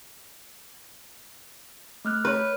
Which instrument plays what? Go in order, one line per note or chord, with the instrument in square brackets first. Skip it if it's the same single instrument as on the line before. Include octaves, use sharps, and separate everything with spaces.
[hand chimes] A3 F6 F#6
[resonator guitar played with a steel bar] B4 [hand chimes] C#5 F6